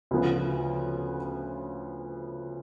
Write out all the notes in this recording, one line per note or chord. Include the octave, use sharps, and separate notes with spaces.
D2 C#3 F3 B3